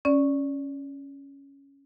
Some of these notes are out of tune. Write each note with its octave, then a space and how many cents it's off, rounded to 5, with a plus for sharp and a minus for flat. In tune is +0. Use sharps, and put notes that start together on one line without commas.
C#4 +0 D5 -10